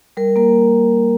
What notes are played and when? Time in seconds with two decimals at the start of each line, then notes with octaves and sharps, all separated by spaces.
0.17 G3 A#4
0.36 A#3 A#4